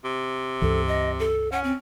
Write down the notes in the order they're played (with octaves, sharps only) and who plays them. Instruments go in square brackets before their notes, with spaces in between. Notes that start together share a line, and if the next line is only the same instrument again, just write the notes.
[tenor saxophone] C3
[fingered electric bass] C#2 G2 E3 [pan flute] A4
[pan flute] D#5
A4
[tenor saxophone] C#4 [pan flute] F#5
[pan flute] C4